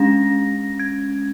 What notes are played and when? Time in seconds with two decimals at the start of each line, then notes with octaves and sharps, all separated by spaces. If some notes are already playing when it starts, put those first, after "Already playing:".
Already playing: G#3 C#4 A#6
0.79 G#6